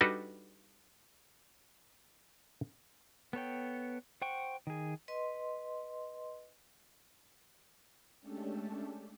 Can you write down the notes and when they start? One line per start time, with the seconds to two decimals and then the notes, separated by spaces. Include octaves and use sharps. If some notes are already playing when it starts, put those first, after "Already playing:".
0.01 G3 D4 D#4 F#4 A4 B4
3.33 B3 A4 C#5 G5
4.22 C5 F#5 G5 C#6
4.67 D#3 G#4
5.08 B4 D#5 C6
8.21 G#3 A3 C#4 D4 G4 A4